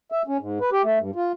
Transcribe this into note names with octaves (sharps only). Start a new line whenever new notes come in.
E5
C#4
G#2
B4
G4
A3
G2
F4